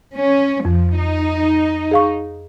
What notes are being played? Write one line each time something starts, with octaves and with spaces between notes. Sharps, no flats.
C#4
F2 F3
D#4
G#4 F5 C#6